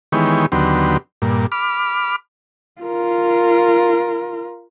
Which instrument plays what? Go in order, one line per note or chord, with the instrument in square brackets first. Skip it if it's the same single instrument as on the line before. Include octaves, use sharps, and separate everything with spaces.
[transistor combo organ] D#3 E3 G#3 B3 G4 C#5
D#2 D3 F#3 B3 G4 C6
G2 A#2
B5 D6 F6
[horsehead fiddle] F4 A#4